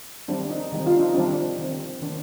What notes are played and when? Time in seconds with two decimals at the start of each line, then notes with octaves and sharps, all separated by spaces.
0.28 D#3 G3 C4 D4
0.50 D#4
0.72 D#3 G3 C4 D#4
0.86 F4
0.97 D4
1.00 D#4
1.15 D#3 G3 C4 D4
1.59 D#3 G3 C4
2.02 D#3 A#3 D4